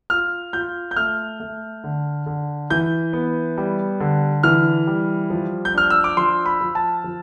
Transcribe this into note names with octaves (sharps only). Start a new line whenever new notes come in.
F4 F6
F4 G6
G6
A3 F6
A3
D3
D3
E3 G6
B3
G3
D3
E3 F6
G3
F3
G6
D4 F6
E6
D6
F3 C6
B5
F3
A5
F3